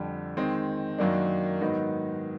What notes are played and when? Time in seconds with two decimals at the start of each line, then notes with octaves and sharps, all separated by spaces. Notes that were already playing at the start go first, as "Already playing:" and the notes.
Already playing: F2 D3 G3
0.37 D#3 G#3 C4 D#4
0.98 F#2 D#3 F#3 A#3 D4
1.61 G#2 D#3 F#3 B3 D#4